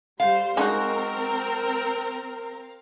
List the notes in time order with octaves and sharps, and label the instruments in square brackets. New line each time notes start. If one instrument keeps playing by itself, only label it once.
[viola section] G3 C5 [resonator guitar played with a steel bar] F5
[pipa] G#3 D#4 F#4 [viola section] C4 A#4 A#5